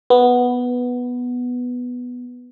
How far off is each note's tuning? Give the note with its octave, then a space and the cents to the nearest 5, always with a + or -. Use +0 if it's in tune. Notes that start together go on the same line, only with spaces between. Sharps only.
B3 +0